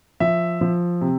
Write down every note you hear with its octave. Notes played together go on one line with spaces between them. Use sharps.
F3 E5
F3
C3